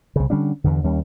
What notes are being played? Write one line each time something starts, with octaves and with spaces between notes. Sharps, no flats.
C2 C#3
D3 G3 C#4 D4
E2 G2 D3
D#2 G3 C#4